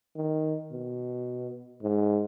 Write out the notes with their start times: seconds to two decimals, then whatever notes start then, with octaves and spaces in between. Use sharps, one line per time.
0.16 D#3
0.71 B2
1.83 G#2